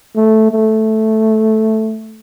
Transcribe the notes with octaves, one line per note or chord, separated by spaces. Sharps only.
A3
A3